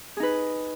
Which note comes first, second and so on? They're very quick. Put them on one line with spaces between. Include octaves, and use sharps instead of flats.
G#4 D#4 B4